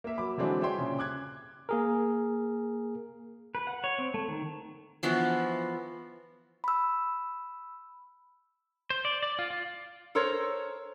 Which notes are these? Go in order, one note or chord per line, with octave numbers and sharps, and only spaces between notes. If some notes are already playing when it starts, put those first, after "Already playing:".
A#3 E5
F#3 B5 D6
D3 E3 F#3 G#3 C4 D4
G#4 C#5 E5 G5 C6
A#2 C#3
D6 F#6 G#6
A#3 G#4 A#4
B4
F#5
C#5
C4
A3
D#3
E3 F3 B3 F#4
B5 E6
C5
D5
D5
F4
F4
A4 A#4 C5 C#5